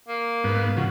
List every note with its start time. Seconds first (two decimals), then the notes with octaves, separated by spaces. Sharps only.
0.08 A#3
0.44 G#2 B3
0.77 C#3 F3 F#4